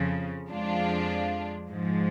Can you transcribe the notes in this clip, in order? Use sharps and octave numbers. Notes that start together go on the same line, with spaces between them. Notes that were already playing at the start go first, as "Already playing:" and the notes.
Already playing: F2 C#3 F3
F2 F3 G#3 D4 F4
G#2 F3 G#3